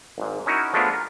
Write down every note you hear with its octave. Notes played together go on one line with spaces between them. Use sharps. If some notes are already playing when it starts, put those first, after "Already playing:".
G#1 G#2
C#4 D#4 E4 F#4 A#4
F3 G#3 A3 B3 D4 F4
A#4